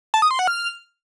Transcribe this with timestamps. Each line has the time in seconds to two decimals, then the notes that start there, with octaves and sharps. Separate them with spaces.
0.14 A5
0.22 D#6
0.31 C6
0.39 F#5
0.47 F6